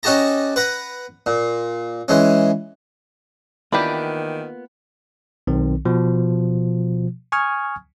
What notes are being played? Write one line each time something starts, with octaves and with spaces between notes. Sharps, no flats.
C#4 D#4 F#4 G4 A5 A#5
B4 F#5 A#5
A#2
E3 G#3 C#4
D#3 E3 A#3 B3 D4 F4 G4 B5
B1 D#3 C4
B2 F3
G#5 C#6 D#6 F6 G#6